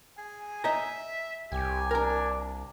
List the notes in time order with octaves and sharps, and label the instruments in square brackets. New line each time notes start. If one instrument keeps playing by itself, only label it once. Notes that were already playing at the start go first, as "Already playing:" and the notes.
[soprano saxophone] G#4 [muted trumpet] G#5
[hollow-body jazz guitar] D#5 A#5 [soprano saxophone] E5
[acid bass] C2 [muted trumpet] G4 [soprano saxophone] G#5
[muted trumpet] D4 [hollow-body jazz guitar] A#4 A#5